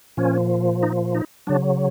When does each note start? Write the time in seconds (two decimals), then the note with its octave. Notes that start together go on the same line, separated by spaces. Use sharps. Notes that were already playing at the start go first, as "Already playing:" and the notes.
0.17 A#2 F3 C#4
0.83 D#4
1.15 D#4
1.47 C#3 F#3 D4